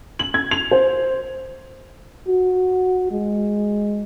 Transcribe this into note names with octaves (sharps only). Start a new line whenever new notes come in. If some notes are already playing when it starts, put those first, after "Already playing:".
F#7
G#6
F7
C5
F#4
G#3